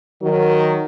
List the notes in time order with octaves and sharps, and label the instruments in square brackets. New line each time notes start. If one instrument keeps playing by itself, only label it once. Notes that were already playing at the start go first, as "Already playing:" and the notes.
[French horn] D#3 [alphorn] F#3